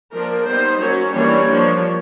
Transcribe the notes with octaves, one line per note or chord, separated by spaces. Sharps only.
F3 A#3 D4 A#4
G3 B3 D#4 C5
F#3 A#3 C#4 C#5
E3 G3 A#3 D4 C#5
F3 A#3 D4